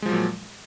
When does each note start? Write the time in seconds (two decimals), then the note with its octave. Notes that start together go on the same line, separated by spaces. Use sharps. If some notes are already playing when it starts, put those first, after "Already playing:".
0.02 G#3
0.06 F3
0.09 F#3
0.12 A#2